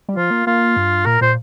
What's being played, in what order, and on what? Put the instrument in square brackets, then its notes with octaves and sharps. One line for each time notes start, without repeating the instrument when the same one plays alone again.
[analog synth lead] G3
[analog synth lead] F3 [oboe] F4
[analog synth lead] A#3
[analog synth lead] A#3 [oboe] F4
[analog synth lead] G2
[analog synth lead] A#2 [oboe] A#4
[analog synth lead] A#2 [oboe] C5